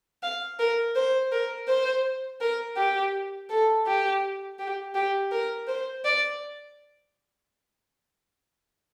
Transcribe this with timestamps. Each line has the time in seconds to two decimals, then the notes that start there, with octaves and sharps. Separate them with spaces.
0.23 F5
0.59 A#4
0.96 C5
1.32 A#4
1.68 C5
2.41 A#4
2.77 G4
3.49 A4
3.87 G4
4.59 G4
4.95 G4
5.32 A#4
5.68 C5
6.05 D5